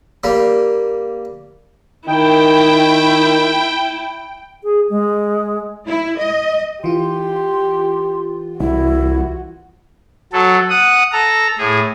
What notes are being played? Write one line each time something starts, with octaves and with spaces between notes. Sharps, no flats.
G3 A#3
D#3 E4 G5
G#4
G#3
E4
D#5
E3 F4 G4 C6
C2 E4 F#4
F#3 A4
F#5 D#6
A4 A#5
A2 G#4